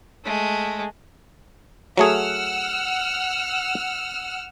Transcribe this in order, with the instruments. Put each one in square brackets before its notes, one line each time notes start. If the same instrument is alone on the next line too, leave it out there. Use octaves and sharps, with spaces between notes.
[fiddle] G#3 A3
[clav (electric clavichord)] F#3 A3 G#4 [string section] F#5 E6 F6